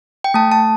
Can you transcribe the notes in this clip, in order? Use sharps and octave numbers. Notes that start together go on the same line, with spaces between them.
G5
A3 A5
A5